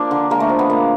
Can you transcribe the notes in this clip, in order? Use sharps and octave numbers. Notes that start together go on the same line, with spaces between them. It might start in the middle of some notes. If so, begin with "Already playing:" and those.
Already playing: F3 A#3 D4
D3
G#3 A#3
A3
F3
B3
A#2 A#3